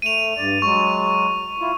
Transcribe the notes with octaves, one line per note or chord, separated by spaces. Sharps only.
A3 D#7 F7
G2 D5
F#3 G#3 C#6
E4 F4